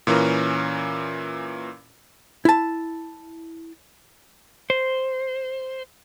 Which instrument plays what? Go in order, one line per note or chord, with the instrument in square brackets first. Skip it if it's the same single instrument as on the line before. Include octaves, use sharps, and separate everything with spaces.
[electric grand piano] A#2 E3 C#4 A#4
[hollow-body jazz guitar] E4 A5
[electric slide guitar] C5